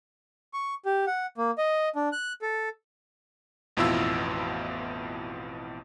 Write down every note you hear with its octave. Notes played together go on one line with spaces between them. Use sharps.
C#6
G4
F#5
A#3
D#5
D4
F#6
A4
A1 F2 B2 E4 F4 E6